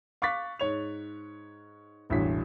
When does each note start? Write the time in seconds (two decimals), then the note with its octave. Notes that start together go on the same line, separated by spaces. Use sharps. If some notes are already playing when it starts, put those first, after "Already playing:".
0.22 F5 C#6 D6 F#6 A6 B6
0.59 G#2 C#5 F7
2.10 E1 A1 G2 E3 F#4 B6